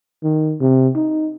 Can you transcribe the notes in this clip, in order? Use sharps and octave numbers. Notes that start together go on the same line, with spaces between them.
D#3
C3
D#4